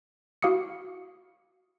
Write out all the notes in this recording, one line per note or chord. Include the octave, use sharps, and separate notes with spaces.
E4 F#4 F5 D6 D#6 C#7